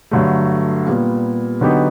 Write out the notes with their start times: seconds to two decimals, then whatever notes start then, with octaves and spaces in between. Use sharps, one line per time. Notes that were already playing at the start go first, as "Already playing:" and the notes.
0.11 G2 D3 F#3 A3
0.86 A#2 G3 B3
1.61 D3 F#3 B3 D#4 G4